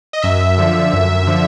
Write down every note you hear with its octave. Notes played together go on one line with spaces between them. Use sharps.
D#5
F#2 E5
D3 F3
F#2
D3 F3